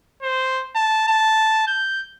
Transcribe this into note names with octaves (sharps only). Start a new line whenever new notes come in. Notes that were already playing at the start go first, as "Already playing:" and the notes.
C5
A5
A5
G6